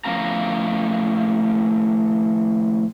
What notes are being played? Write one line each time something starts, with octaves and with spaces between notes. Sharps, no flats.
A2 F3 C#4 F5 A#5